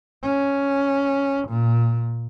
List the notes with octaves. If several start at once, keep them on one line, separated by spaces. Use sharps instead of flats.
C#4
A#2